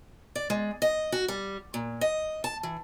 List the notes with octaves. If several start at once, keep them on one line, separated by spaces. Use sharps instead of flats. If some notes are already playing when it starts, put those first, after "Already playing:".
D5
G#3
D#5
F#4
G3
A#2
D#5
A5
E3